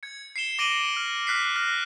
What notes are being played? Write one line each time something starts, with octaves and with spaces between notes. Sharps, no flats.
G#6 C#7
C7 C#7 E7 G7
D6 A#6 D7 D#7 F#7 G7
F6
F6 F#6 B6 C7
F6 F#6 A#6